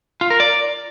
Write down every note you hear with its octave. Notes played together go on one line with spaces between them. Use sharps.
F4
A#4
D5